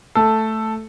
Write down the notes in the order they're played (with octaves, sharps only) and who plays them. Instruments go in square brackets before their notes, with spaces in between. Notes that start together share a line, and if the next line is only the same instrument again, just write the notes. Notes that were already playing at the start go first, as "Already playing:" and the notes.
[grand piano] A3 A4